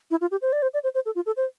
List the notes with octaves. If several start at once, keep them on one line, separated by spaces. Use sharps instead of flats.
E4
F4
G4
C5
D5
C5
D5
C5
C5
A4
F4
A4
C5